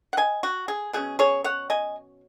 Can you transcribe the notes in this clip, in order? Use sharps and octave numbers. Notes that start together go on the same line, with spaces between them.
F#5
D#5 G#5
F#4
G#4
B2 F#3 C#4 G#4
G#4 C#5
C#5 F#5
D#5 G#5